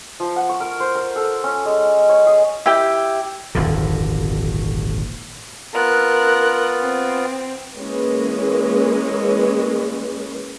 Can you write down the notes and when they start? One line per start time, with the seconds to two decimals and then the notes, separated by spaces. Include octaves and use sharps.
0.20 F3
0.36 F#5
0.49 C#6
0.60 A#4
0.80 C5
0.95 A#4
1.16 A4
1.44 C#4
1.65 G#3
2.09 C#5
2.27 G#4
2.66 E4 G4 G5
3.55 D#1 G#1 F2 D3
5.74 B3 F4 A#4 F#6
6.81 C4
7.77 E3 G#3 A#3 C#4 B4